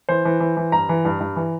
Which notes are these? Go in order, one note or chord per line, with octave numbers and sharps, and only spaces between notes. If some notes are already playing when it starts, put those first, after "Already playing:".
E3 C5
E3
E3
E3
G2 A#5
E3
G2
G2
E3